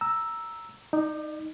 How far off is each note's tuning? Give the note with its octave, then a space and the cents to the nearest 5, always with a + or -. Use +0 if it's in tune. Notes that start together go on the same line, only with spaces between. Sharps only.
A#5 +0 E6 +0
D#4 +0 D5 +35